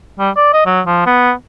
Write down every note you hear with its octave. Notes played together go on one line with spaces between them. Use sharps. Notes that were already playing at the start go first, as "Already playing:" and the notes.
G3
D5
D#5
F#3
F3
B3